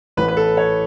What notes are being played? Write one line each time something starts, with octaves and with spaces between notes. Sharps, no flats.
A1 A2 E3 B4
B4
A4
C#5